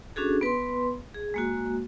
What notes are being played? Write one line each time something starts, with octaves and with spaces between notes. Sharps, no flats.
C#4 D4 F#4 G#4 A4
B3 B4 B5 C6
G#4
G#3 A#3 F#4